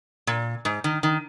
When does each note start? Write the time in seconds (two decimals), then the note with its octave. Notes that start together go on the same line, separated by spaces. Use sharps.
0.27 A#2
0.65 G#2
0.84 D#3
1.03 D#3